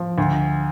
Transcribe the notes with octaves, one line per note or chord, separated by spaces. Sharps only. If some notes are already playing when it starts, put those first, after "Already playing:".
Already playing: F3
D2